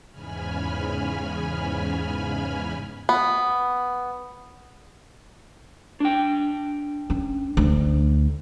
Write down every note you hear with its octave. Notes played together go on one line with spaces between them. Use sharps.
E2 G#2 C#3 G#5 B5 F6
B3
D4 G5
C#4
D2